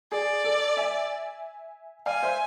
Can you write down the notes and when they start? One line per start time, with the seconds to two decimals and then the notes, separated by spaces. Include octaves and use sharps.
0.12 G#4 D5
0.44 A4
0.77 E5 G#5
2.06 D5 F5 G#5
2.23 C5 E5